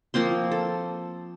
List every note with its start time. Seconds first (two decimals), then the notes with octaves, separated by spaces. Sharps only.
0.14 F3 A#3 C4 C6
0.52 A4